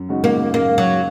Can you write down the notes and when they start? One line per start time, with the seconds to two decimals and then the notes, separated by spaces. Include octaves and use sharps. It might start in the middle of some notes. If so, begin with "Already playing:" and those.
Already playing: F#2
0.09 C#3 G#3 D#4 F#4
0.24 A#3
0.54 F#2 A#3
0.78 F#3